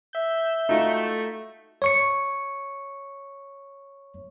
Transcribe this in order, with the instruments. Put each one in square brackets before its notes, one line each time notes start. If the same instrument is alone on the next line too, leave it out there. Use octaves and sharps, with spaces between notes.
[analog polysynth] E5 G6
[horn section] A3 [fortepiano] D#4 F4 F#4
[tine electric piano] C#5 C#6 C#7